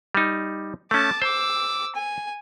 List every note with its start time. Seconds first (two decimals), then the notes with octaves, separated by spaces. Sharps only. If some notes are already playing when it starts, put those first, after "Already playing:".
0.15 G3 D#4
0.91 A3 C#4 A5 D6
1.22 C5 D6 E6
1.95 G#5